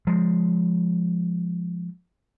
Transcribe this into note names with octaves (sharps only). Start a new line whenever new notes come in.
F3 G#3